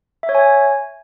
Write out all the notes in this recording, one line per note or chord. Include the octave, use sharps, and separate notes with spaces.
E5
C#5
G#5